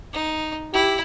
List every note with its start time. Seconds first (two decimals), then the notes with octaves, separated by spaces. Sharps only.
0.13 D#4
0.74 E4 G4